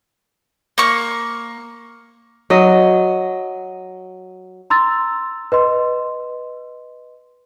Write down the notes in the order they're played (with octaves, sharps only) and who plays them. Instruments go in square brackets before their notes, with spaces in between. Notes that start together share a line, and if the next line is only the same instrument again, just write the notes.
[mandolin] A#3 C#6
[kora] F#3 D#5
[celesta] A#5 C6 E6 A6
B4 D#5 C6